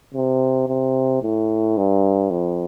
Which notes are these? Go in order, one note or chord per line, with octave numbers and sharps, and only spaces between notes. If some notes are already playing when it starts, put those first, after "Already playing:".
C3
C3
A2
G2
F2